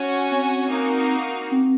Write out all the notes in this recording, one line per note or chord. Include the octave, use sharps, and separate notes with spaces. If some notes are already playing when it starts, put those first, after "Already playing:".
Already playing: C#4 F#4 C#5 G#5
C4
A#3 D#4 F#4
C4